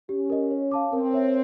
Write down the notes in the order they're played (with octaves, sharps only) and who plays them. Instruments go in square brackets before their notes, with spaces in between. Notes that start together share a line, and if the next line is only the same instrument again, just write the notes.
[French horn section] C#4 [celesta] G4
[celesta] A#4 D#5
C#5
F5 A5 D6
[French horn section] C4 [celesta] A#4
[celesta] C#5 E5